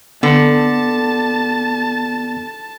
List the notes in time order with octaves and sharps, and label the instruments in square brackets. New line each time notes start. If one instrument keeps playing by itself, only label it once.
[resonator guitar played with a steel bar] D3 [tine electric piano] B3 [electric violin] A5